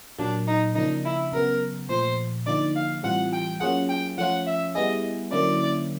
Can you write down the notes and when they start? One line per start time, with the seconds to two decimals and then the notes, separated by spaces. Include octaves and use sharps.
0.19 A#2 F#3 A#3 D4
0.48 D#4
0.75 C#3 F3 A#3 D4 D#4
1.05 E4
1.32 C#3 F#3 B3 A#4
1.89 A#2 F3 A3 C5
2.47 D3 F3 A#3 D#4 D5
2.75 F5
3.03 A2 E3 G3 C4 F4 F#5
3.33 G5
3.60 F#3 A#3 C#4 F4 G#4 F#5
3.89 G5
4.18 F3 A3 C#4 F4 F#5
4.47 E5
4.75 G3 B3 E4 G#4 D#5
5.32 D3 F#3 A#3 C#4 E4 D5